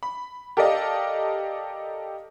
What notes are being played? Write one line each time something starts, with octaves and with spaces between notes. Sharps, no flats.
B5
G4 A4 A#4 D5 D#5 F5